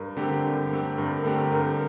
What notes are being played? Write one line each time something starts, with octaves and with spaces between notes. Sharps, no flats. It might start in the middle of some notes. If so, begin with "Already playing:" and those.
Already playing: G2 A#4
D3 A3 C4 G4
G2
D3 A3 C4 G4
G2 A#4
D3 A3 C4 G4
G2 A#4